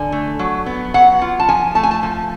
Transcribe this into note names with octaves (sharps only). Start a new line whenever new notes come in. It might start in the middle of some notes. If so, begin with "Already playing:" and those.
Already playing: D3 G#5
A3
F#3
B3
F#3 F#5
F4
A5
F3 G#5
A3 A5
G#5
A5
F3